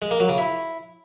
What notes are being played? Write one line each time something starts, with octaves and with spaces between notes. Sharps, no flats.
G#3
A#3
F#3
C#3
E4